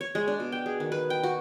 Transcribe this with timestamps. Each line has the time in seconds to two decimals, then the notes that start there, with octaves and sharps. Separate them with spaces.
0.01 C#5
0.15 G#3
0.28 D4
0.40 B2
0.52 G5
0.66 G#4
0.80 D#3
0.92 B4
1.10 G5
1.23 F#4